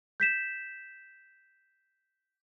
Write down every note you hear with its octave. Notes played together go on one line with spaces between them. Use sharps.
G6 B6 E7